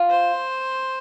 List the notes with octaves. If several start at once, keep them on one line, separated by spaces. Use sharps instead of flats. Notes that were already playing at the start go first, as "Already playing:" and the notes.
Already playing: F4
C5